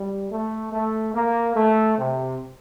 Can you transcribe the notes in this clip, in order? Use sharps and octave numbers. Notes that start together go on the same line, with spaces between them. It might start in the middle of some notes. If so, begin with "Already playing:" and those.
Already playing: G3
A3
A3
A#3
A3
C3